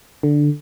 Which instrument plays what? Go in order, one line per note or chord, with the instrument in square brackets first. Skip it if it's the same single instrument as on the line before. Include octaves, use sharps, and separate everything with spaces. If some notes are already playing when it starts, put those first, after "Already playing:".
[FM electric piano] D3